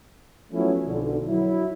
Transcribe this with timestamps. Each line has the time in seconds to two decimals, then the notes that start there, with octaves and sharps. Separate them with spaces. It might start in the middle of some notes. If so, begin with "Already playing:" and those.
0.53 F3 F#3 A3 B3 C#4 E4
0.86 B1 F2 D3
1.29 F#3 E4